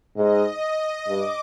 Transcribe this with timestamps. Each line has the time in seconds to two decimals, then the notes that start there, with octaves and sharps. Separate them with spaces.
0.16 G#2 D#5
1.07 G2 D6